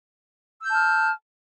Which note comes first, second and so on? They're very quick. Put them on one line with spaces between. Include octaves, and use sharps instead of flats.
E6 G6 A5 F6